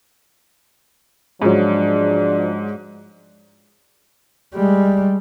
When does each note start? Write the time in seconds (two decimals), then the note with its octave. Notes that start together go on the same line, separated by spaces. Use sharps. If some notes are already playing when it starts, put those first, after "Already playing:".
1.42 G#2 F3 F#3 D4 D5
4.54 G3 G#3